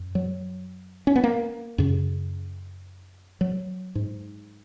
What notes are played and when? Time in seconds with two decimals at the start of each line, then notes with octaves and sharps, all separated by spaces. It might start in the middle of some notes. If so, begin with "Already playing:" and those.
Already playing: F#2
0.15 F#3
1.07 C#4
1.16 B3
1.24 A#3
1.78 F#2 C#3
3.41 F#3
3.95 G#2